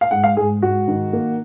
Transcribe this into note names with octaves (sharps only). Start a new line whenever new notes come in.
F5
G#2 F#5
F5
G#2 G#4
G#2 F#4
D#3
A#3